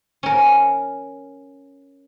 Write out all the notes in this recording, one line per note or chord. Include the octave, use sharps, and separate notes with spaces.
C#4 A#4